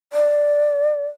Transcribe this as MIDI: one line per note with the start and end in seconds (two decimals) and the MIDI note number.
0.13 1.06 74